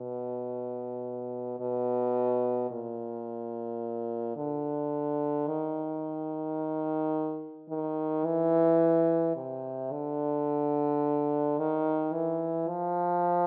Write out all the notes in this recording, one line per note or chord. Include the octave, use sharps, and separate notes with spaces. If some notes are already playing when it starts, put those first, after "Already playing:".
Already playing: B2
B2
A#2
D3
D#3
D#3
E3
C3
D3
D#3
E3
F3